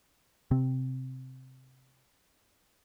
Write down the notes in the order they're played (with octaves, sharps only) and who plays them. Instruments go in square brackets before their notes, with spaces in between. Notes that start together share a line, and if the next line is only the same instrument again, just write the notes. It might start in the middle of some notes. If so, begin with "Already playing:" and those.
[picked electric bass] C3 C4